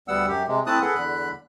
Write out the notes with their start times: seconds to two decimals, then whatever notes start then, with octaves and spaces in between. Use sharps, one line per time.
0.08 D2 G3 B3 F#5 E6
0.28 F#2 G4
0.47 C3 G#3
0.66 A3 C4 E4 A5 D#6 F#6
0.82 G#4 A4 B4 F#5
0.95 E2 D3 B5 F#6